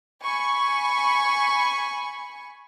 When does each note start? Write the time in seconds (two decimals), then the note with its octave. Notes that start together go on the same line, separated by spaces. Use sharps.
0.22 G#5 B5 C#6